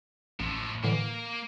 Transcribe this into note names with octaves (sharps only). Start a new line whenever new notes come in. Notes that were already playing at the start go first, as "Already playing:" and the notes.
A1 A2 F3
A2 D3 E3 A#3